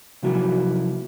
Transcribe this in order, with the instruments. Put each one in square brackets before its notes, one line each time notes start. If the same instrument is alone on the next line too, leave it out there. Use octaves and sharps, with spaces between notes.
[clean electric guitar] C3 F3 F#3 A#3 E4 F#4